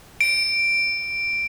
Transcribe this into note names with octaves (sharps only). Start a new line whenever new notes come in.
D7